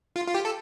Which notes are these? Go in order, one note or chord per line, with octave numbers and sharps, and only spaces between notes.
F4
F4
G4
A4